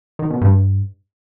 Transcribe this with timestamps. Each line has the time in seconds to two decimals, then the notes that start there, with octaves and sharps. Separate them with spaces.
0.19 D#3
0.30 B2
0.41 G2